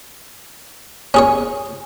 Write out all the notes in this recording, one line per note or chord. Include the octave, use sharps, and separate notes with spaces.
C#4 G#4 C#5